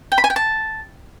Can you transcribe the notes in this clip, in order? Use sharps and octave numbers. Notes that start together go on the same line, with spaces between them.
G5
B5
G#5
G5
A5